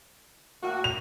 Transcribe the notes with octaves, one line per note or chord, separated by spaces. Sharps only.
A2 A#3 F#4
F7